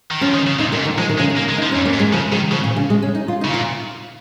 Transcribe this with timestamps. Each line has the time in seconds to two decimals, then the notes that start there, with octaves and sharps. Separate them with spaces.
0.11 D#3
0.21 F3 C#4
0.34 D#3
0.47 C#3
0.59 A#2 D#4
0.72 A#2 A#3
0.78 G#2
0.85 D#3
0.98 F3 G#3
1.09 D#3
1.18 C#3 G#3
1.30 D#3
1.36 A#3
1.49 G#3
1.58 F3 D#4
1.71 F2 C#4
1.85 A#3
1.94 G#2
1.99 G#3
2.13 C#3 F3
2.32 D#3 G#3
2.51 C#3 F3
2.64 A#2
2.76 C#3
2.90 G#3
3.02 C#4
3.15 D#4
3.28 F4
3.41 D#4
3.44 C#3
3.51 A#2
3.54 F4